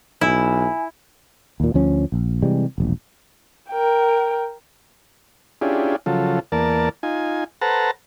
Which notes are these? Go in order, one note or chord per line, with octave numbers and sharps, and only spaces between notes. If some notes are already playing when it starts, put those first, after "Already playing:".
B1 E4 G#5
D#2 A#2
D2 F3 C#4
A#1
C3 E3 G3 G#3
E1 A#1
A#4 G5
C#4 D4 E4 F4 G4 G#4
C#3 F3 F#3 F4 A4
E2 A#3 A#4 D5 A5
D#4 F4 G#5
A4 B4 C5 F#5 A5 A#5